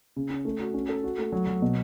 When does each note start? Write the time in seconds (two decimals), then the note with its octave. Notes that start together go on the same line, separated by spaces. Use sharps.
0.16 C#3
0.30 C#4
0.45 A3
0.59 F#4
0.74 C#4
0.89 A4
1.04 F#4
1.18 A3
1.32 F#3
1.47 F#3
1.62 B2